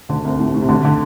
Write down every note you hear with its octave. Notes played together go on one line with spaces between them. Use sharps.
D2 D3
C2 C3
A2
A2
C3
D2 D3
D3